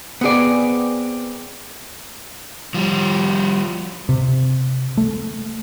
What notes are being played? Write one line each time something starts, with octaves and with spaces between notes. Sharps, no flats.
B3 C4 G#4 D5
F3 G3
C3
A3